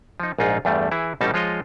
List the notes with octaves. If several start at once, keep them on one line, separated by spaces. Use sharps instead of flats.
F3 D#4
A#1 G#2 D#4 F4 G#4
E2 G2 G3 A3
E3 E4 G#4
A1 B2 G3 C#4 D#4 A5
F3 G#3 F4 C#5 D#5 F5